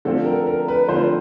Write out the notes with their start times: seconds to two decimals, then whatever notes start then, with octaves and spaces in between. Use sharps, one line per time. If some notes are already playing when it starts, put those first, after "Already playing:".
0.05 D3 F3 A3 C4 F4 A4
0.26 A#4
0.46 A#4
0.68 B4
0.88 D3 F3 A3 C4 F4 C5